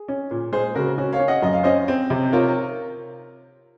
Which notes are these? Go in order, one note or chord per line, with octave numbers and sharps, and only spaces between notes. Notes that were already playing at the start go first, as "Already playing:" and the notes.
Already playing: G#4
C#4
A#2
G#3 G#4 C5
C#3 F#4 A#4
C#4 F#4
C#5 F5
C#4
D#5 F#5
F#2 D#5
F5
C#4 C5 D#5
C4
C3
F4 A#4 C#5